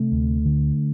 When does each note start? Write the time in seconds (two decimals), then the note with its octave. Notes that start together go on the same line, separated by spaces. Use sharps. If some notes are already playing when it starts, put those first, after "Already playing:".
Already playing: C3 A3
0.11 D2
0.45 D3